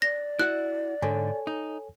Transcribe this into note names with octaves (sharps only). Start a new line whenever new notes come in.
D5 A#6
E4 F#4 F#5 F#6
G#2 D3 A4 C#5 G#5
D#4